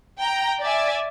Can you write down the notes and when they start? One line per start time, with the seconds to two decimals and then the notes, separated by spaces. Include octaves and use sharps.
0.19 G5 A#5
0.61 D5 E5 G#5